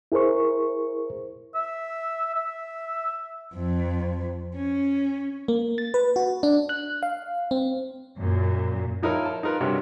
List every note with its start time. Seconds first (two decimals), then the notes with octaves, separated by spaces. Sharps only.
0.12 E4 G#4 A#4 C5 C#6
1.55 E5
2.35 E5
3.55 F2
4.55 C#4
5.48 A#3
5.78 A6
5.94 B4
6.16 F#4
6.43 D4
6.69 F#6
7.03 F5
7.51 C4
8.17 F#2 A#2
9.03 F3 D#4 E4 A#4 C#5 F6
9.25 A5
9.43 D#4 F4 A#4 B4
9.61 G2 C3 C#4 F#4 C#5